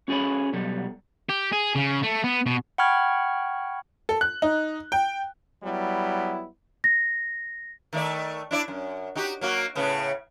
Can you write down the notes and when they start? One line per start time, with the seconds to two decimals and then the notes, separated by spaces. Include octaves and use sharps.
0.08 C#4 F#4 G#4 A4 C#5 B5
0.53 B2 F#3 G3 A4
1.29 G4
1.52 G#4
1.75 C#3
2.03 A3
2.24 B3
2.46 B2
2.78 F#5 G5 B5 C#6 F6 G#6
4.09 A4
4.21 F#6
4.42 D#4
4.92 G5
5.63 F#3 G3 B3 E4
6.84 A#6
7.93 D#3 A3 D5
8.51 D4 E4 D5
8.68 F#2
9.15 D#4 F#4 G4
9.41 F#3 A#3 F#4
9.75 A2 C#3 B3